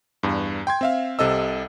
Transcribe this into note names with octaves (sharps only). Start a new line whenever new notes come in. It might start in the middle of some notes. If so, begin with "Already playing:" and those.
E2 G2
G5 C6 G#6
C4 E5 F5
C2 C3 A4 D#5 E6